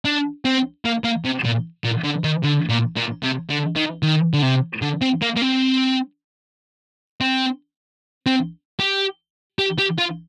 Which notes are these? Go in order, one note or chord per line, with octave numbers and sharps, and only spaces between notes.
D4
C4
A#3
A#3
C3
A#2
A#2
D3
D#3
D3
A#2
A#2
C3
D3
D#3
D#3
D3
C3
D3
C4
A#3
A#3
C4
C4
C4
G4
G4
G4
F4